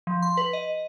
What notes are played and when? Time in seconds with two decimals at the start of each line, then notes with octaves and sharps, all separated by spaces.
0.07 F3
0.22 C6
0.37 B4
0.53 D#5